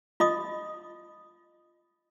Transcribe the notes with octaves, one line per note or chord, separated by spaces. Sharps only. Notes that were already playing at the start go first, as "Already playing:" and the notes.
F4 D#5 D#6